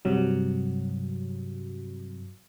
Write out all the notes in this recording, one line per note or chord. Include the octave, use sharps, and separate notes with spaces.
G2 C3 F#3